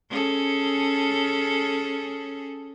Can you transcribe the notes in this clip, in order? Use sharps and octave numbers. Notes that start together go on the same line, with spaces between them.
C#4 G#4 A4